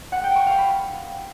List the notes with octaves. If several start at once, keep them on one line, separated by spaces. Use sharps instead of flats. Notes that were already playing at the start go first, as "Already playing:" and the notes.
F#5
G5
C#6
F5
B5